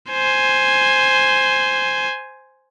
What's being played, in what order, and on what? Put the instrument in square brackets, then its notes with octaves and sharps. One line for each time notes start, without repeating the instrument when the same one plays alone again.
[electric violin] C5 G#5